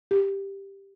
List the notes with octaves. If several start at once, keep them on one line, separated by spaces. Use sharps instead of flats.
G4